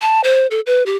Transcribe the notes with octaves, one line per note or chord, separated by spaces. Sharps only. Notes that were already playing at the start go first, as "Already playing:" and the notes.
A5
C5
A4
B4
G4